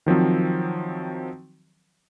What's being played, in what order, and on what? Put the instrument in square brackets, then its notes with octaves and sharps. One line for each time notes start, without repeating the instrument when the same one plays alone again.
[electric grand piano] D#3 F3 F#3 C4